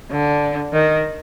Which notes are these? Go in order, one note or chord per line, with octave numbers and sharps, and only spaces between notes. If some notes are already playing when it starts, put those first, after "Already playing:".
D3
D#3